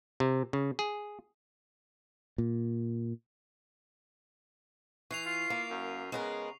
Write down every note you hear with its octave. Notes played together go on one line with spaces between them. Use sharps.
C3
C#3
G#4
A#2
E3 C#6 C7 F7
F4
A#3
F#2
C#3 G#3 B3 A#4